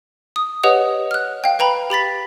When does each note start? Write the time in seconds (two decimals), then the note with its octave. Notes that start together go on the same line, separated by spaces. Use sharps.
0.36 D#6
0.63 G4 B4 C#5 D#5 F#5 D#6
1.11 F6 F#6
1.44 F5 G5
1.59 B4 G5 A#5 B5
1.90 G4 B5 A6 B6